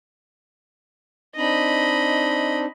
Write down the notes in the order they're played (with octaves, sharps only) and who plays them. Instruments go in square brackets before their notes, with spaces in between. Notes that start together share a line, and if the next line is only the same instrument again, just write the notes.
[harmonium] C4 D4 D#4 [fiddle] D#5 B5